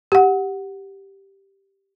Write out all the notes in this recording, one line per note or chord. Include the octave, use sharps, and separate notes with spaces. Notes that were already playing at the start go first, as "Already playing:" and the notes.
G4 F#5